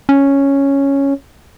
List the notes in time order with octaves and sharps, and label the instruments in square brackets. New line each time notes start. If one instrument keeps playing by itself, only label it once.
[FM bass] C#4